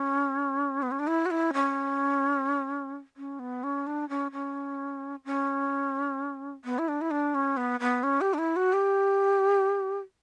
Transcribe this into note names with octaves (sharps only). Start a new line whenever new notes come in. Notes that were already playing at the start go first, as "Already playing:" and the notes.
Already playing: C#4
B3
C#4
D4
E4
F#4
E4
C#4
C#4
B3
C#4
D4
C#4
C#4
C#4
B3
E4
D4
E4
D4
C#4
B3
B3
C#4
G4
D4
E4
F#4
G4